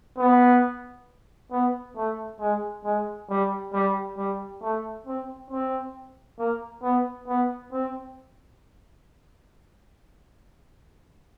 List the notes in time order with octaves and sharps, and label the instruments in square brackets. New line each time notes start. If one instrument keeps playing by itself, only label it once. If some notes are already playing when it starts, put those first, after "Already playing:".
[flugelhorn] B3
B3
A3
G#3
G#3
G3
G3
G3
A3
C4
C4
A#3
B3
B3
C4